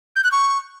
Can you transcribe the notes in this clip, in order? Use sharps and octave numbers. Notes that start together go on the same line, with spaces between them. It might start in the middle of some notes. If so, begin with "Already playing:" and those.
G6
F#6
C#6